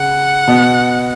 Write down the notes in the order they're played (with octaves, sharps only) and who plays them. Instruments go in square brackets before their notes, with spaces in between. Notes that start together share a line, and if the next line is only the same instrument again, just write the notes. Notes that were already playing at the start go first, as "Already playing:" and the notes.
Already playing: [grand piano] C#3 [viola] F#5
[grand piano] B2